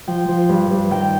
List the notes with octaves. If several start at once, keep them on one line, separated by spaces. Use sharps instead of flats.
F3 G5
F3
G2
G2
D#3 G5